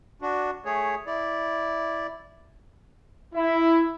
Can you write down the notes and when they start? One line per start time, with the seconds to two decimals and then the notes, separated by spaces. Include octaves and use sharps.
0.22 D4 F#4
0.65 A3 G#4 C#5
1.07 E4 D5
3.34 E4